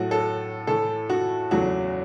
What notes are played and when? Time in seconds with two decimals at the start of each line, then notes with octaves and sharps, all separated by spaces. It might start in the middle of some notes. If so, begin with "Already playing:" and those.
Already playing: A2 F#3 A3 F#4
0.11 A4
0.67 A2 E3 A3 A4
1.10 F#4
1.51 E2 C#3 F#3 A3 F#4